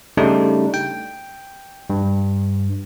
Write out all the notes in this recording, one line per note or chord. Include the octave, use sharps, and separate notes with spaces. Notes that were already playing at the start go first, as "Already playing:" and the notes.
C#3 G3 A3 D4 D#4
G5
G2